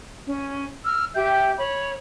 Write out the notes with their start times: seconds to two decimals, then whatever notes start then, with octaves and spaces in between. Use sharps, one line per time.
0.26 C#4
0.85 E6 F6
1.15 G4 E5 G5 G6
1.57 C#5 B5